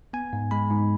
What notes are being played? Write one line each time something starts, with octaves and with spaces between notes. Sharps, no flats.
B3 G#5
G#2
G#3 B5
G#2